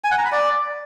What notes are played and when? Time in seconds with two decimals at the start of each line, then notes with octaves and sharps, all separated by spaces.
0.04 G#5
0.11 F#5
0.18 A#5
0.25 B5
0.32 D5